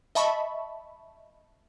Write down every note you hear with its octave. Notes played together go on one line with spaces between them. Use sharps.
D#5 E5 A5 B5 C#6